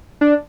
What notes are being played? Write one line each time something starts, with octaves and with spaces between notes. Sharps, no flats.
D4